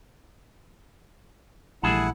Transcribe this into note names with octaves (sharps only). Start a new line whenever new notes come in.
A#1 E3 G3 A3 E4 G#4 F#5 A5